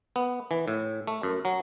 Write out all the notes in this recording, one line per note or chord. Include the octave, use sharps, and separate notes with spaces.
B3
E3
A2
A3
F#2
F#3